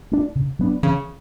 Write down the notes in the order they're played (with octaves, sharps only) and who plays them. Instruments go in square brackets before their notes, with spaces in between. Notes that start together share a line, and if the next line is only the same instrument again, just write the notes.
[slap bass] A3 D4
C#3
F#3 B3 D4
[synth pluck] C#3 [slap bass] E3